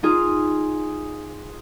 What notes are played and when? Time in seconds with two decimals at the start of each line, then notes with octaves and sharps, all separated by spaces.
0.03 D#4 F4 G#4